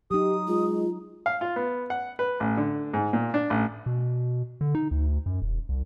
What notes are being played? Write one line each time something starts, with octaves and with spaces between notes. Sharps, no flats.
F#3 D#4 G4 D#6
G#3 F4
F5
F4
B3
F#5
B4
A1
D3
G#2
A#2
D4
A1
B2
D3
D#4
D2
F#2
E1
C2